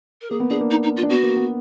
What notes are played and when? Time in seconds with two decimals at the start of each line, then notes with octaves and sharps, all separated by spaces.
0.22 A#4
0.31 A#3 G#4
0.40 B3
0.50 D4 G#4
0.61 A#3
0.71 D#4
0.83 D#4
0.97 F4
1.03 D4
1.10 B3 F#4
1.23 A#3
1.36 B3